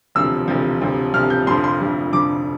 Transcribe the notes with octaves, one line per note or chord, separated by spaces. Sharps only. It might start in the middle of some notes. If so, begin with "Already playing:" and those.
E1 D2 C3 F3 E6
E1 D2 C3 F3
E1 D2 C3 F3
E1 D2 C3 F3 F6
G6
F1 F2 D3 F3 C6
C6
F1 F2 D3 F3
F1 F2 D3 F3 D6